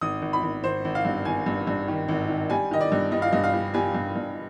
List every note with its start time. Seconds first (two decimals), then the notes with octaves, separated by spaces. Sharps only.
0.01 G#1 D#6
0.22 G#1
0.33 B5
0.43 G#1
0.64 G#1 C5
0.85 G#1
0.95 F5
1.05 G2
1.25 G#1 G#5
1.46 G2
1.67 G2
1.88 D#3
2.08 G#1
2.29 D#3
2.50 G3 G#5
2.71 D#3 D#5
2.81 D5
2.92 G2
3.12 G3 D#5
3.22 F5
3.32 G2 D#5
3.44 F5
3.53 G3
3.74 G3 G#5
3.95 G2
4.16 G2